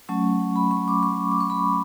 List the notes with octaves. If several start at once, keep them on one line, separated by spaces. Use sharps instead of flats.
F#3 A3 C#4 C#6
B5
C#6
D6
C#6
D6
C#6
B5